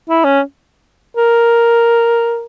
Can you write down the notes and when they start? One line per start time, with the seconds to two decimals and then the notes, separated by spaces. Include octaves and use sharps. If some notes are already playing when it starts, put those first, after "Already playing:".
0.09 E4
0.24 C#4
1.17 A#4